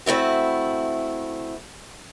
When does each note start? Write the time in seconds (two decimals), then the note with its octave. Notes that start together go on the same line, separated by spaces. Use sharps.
0.06 A3 C4 E4 F#4